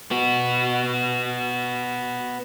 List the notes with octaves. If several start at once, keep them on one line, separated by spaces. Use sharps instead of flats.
B3 F#4